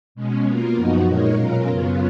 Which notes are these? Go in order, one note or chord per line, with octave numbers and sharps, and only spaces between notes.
B2 G#3 C#4
B2 A#3 F4 A#4
F#2 F3 B3 D#4 F#4
A#2 G#3 D#4 A#4 C#5
B2 F#3 C#4 F4 A#4
F#2 C#3 F#3 B3 F4